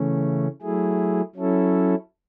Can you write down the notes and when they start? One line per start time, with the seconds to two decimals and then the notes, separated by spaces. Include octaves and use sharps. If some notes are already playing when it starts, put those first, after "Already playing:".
Already playing: C#3 E3 A3 C#4
0.62 F#3 A3 E4 G#4
1.36 F#3 C#4 E4 A4